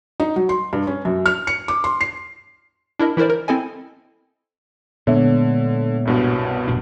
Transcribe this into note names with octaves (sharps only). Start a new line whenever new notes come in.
D#4
F#3
C6
G2
C#4
F#2
F6
C#7
D6
C6
C7
D4 E4 A#4 D#5
E3 E4 A#4 C5 D5
A#4
C4 E4 A4 D#5 G#5
A#2 D3 G#3 B3 C#5 E5
C2 G2 B2
E1 A#2 D4